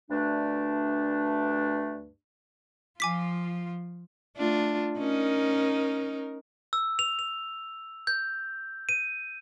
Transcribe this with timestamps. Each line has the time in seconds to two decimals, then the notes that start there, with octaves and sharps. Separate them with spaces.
0.09 D2 G2 A3 D4
3.00 F3 F4 G#5 D6 B6
4.37 A3 D4 F4
4.98 C#4 D#4 A#4
6.73 E6
6.99 F7
7.19 F7
8.07 G6
8.89 D#7